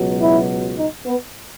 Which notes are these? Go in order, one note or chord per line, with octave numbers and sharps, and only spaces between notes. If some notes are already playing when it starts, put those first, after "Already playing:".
Already playing: C#2 B2 F#3
E4
D#4
B3